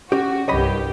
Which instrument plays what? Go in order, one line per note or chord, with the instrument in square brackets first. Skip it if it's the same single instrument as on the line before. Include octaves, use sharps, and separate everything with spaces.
[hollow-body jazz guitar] C#4 G4 [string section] F#4
[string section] C2 G2 G4 [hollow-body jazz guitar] C#5 D#5 B5